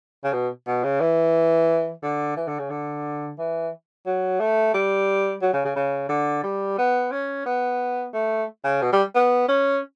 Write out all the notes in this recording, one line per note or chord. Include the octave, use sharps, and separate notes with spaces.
C#3
B2
B2
C#3
E3
D3
E3
D3
C#3
D3
E3
F#3
A3
G3
F#3
C#3
C#3
C#3
D3
G3
B3
C#4
B3
A3
C#3
B2
G3
B3
C#4